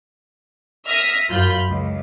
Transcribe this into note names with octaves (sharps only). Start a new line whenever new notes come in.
E5 D#6 F6 A#6 B6
F#2 F4 B5 G6
C#2